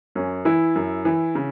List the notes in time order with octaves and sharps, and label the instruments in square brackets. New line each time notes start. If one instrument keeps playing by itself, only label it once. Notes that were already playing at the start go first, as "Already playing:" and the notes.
[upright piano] F#2 C#4
E3 E4
F#2
E3
C#3